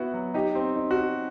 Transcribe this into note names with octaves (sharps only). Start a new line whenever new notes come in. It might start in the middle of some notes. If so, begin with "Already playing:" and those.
Already playing: B3 E4 F#4
F#3
D#4 G4
C4
D#4
F#4
D#4